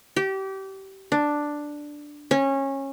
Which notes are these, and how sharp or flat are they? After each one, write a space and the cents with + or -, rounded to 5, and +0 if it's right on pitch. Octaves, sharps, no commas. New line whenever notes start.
G4 -25
D4 +5
C#4 -20